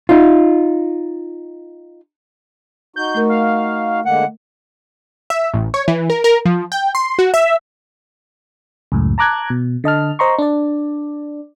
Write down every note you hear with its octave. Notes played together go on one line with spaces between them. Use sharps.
D#4 F4
D#4 F#4 G6
A3 A#4
F5
D3 G#3 A#3 F#5
E5
A1
C#5
E3
A#4
A#4
F3
G5
C6
F#4
E5
C#2 F#2 A2
A5 A#5 D6 F#6 G#6
B2
D3 D#5 A5 F6
C5 D#5 A#5 C6 C#6
D4 D5